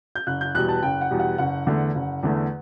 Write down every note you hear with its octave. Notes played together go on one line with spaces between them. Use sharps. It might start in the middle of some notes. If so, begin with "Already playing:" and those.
G6
F#1 F#6
G6
E2 B2 G3 F#6
A5
F#1 G5
F#5
E2 B2 G3
F#5
F#1 F#5
E2 D3 A3
F#1
E2 D3 A3